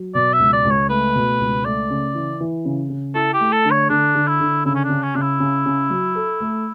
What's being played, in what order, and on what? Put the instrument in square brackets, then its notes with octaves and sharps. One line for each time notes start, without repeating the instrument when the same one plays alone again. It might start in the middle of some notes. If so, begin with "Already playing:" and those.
Already playing: [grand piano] F#3
[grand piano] B2 [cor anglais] D5
[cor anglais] E5
[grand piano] C#2
[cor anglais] D5
[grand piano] C#2
[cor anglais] C#5
[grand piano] A3 [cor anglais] B4
[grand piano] B2
C#2
[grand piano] A3 [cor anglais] D5
[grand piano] C#3
E3
E3
C#3
C#3
[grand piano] E4 [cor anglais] A4
[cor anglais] G4
[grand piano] A3
[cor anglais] A4
[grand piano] D3
[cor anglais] C#5
[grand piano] D3 [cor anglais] D4
[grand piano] D3
[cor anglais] E4
[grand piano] D3
[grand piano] C#3 [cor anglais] E4
[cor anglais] C#4
D4
[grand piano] C#3
[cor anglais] C#4
[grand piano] C#3 [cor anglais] D4
[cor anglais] E4
[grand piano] C#3
C#3
F#3
A4
A3